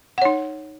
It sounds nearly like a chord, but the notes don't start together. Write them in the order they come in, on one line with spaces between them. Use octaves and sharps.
F#5 C#5 D#4